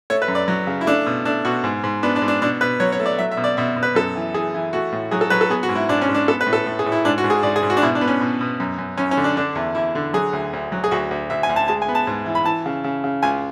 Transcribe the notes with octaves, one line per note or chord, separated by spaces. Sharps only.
A3 C#5
B4
F#2
D5
F#3
C#3
E4
A3 D4
B2
A3 D4
B2 F#4
G#2
G#2
B3 D4
D4
G#2
D4
B2 D4
B2 B4
F#3 C#5
C#5
A3
D5
F#3 E5
E5
B2
D5
B2 E5
B2
B4
F#2 A4
E3
E3 G#4
E3
A3 F#4
A2
F#3 G#4
A4
F#3 B4
A4
B3 G#4
F#4
G#2
E4
G#2 D4
C#4
G#2
D4
B3 A4
B4
A2
A4
A2
G#4
A2
E4
G#2 D4
F#4
G#2
G#4
G#2 D5
G#4
G#2
F#4
D4
B2 E4
D4
B3
C#4
B2
B2
F#2
F#2
F#2 C#4
C#4
D3
D4
D3 D4
E2
E2 E4
D3
F#3 G#4
D2
D2
F#3
G#4
D2 F#4
D2
D2 E5
G#5
D2
A5
G#3 A5
G#5
B3
A5
G#2
E3
B5
E3 A5
C#3
C#3
C#3
C#2 G#5